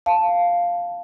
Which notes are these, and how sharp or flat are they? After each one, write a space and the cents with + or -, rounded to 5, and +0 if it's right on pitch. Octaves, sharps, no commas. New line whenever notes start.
F5 +0 A5 +0